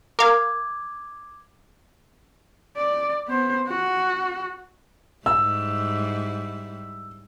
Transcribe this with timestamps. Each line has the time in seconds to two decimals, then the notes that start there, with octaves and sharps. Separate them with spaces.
0.19 A#4 F5 D6 G#6
2.77 D5
3.28 B3 C5
3.68 F#4
5.26 G#2 G3 E4 E6